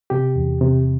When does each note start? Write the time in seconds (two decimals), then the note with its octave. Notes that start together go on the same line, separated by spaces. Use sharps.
0.10 C3 G4
0.36 E2
0.61 C3